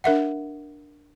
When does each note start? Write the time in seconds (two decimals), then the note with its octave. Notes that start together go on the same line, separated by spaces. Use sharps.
0.04 D4 A#4 E5 F#5